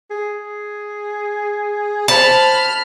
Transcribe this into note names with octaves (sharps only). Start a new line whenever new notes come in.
G#4
C5 A5 B5 F6